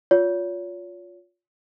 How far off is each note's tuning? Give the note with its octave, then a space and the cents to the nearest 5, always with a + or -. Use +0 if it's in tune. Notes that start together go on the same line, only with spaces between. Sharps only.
F4 +15 C#5 +40